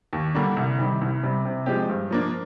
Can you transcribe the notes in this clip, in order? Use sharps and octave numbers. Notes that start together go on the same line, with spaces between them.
D#2
D3 G3 A#3 D4
C2
C3 D#3 G3
C2
C3 G3
C3
F3 G#3 C4 G4
G2
F3 A#3 D4